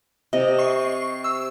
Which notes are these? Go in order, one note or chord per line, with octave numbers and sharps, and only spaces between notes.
C3 D#5
C#6 C7
E6